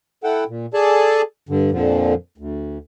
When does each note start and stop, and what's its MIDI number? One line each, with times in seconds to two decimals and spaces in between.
0.24 0.44 64
0.24 0.44 69
0.24 0.44 78
0.24 0.44 79
0.49 0.66 46
0.74 1.22 68
0.74 1.22 69
0.74 1.22 74
0.74 1.22 80
0.74 1.22 81
1.49 1.71 43
1.49 1.71 50
1.72 2.14 41
1.72 2.14 46
1.72 2.14 50
1.72 2.14 53
2.38 2.78 38